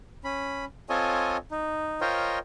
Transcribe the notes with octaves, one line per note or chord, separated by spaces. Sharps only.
C#4 B5
C4 F4 A4 C#5 D#5 G#5
D#4
F4 A#4 C5 C#5 D#5 G5